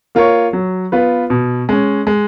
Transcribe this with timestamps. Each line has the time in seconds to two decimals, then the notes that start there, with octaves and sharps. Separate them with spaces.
0.15 A#3 F4 A#4 C#5
0.53 F#3
0.92 B3 F4 B4
1.30 B2
1.69 G#3 C#4
2.07 G#3